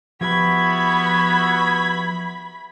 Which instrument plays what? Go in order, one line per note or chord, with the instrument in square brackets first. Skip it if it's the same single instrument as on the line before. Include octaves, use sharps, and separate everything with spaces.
[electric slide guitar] F3 G4 [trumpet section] B3 F#4 E5 [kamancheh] B5 [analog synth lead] G#6